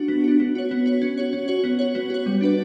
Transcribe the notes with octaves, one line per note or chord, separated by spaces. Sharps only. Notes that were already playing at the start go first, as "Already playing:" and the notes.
Already playing: D4 F#4
B3
D4 F#4
B3
F#4 C#5
B3
F#4 C#5
C#4
F#4 C#5
C#4
F#4 C#5
B3
F#4 C#5
B3
F#4 C#5
G3
D4 F#4 B4 D5